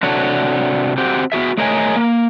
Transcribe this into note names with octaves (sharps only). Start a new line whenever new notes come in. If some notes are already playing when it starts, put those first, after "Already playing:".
C3 D4 F#4 A4 C#5
C4 F#4 G4
B3 F#4 G#4 E5
A3 G#4 A#4 C#5 D#5 G#5
A#3